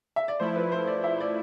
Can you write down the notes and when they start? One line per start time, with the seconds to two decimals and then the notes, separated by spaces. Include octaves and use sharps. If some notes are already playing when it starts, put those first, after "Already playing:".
0.16 E5
0.28 D5
0.40 F3 A3 E4 C5
0.56 B4
0.72 C5
0.87 D5
1.04 E5
1.20 D5